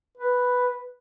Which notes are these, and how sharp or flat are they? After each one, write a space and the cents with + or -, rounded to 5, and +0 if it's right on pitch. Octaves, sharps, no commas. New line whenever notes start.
B4 +0